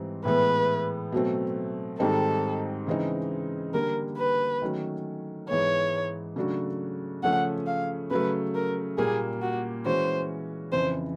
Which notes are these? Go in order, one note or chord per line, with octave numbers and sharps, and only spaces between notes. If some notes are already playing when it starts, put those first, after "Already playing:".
Already playing: G#2 E3 G3 C4
A2 E3 G#3 B3 B4
B2 F#3 A3 C4
G#2 D#3 G3 C4 D#4 A4
C#3 E3 G#3 C4 D#4
D3 G3 A#3 A#4
B4
D#3 F#3 A3 C#4 F#4
G#2 E3 G#3 B3 C#5
C#3 F#3 A3 D4 F#4
C#3 F3 A3 C#4 F#5
F5
C#3 F#3 A3 B4
A#4
A#2 G3 A#3 G#4
F#4
E3 G#3 C#4 F#4 C5
F2 C#3 E3 C5